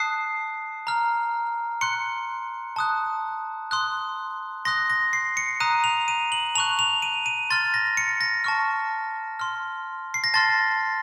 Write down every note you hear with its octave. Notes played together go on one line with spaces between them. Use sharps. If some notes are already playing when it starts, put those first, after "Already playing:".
Already playing: A5 D#6 F#6 C7
A#5 F6
C6 F#6 C#7
A5 D#6 F#6
C6 D#6 F#6
C6 D#6 F#6 A#6
A#6
C7
C#7
A#5 D#6 F#6 D#7
F7
D#7
F#7
A5 C#6 F#6 F7
F7
D#7
D#7
C6 F6 A6
A#6
C#7
A#6
A5 C#6 F6
C6 F6
C7
A#6
A5 C6 F6 A6